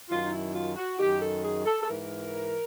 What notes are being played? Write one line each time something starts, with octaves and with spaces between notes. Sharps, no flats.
F#2 D#3 F4
D#4
E4
F4
F#4
F#2 D#3 G4
A4
G#4
A4
A4
G#2 E3 A#4